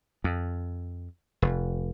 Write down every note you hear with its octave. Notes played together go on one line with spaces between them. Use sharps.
F2
F1